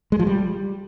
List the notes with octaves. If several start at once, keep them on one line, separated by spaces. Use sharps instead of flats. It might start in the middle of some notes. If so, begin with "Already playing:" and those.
G#3
F3
G3